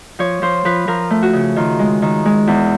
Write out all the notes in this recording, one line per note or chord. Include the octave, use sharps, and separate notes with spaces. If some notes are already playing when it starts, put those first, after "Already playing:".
F3 C#5
F3 C5
F3 B4
F3 A#4
A3
F#4
C#3
D#3 F4
G#3
D#3
G#3
E2